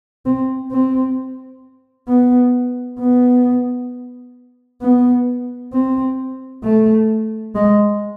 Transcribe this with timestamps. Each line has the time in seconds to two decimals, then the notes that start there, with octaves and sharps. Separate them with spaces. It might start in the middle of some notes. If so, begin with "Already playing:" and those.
0.26 C4
0.72 C4
2.08 B3
2.99 B3
4.82 B3
5.73 C4
6.64 A3
7.55 G#3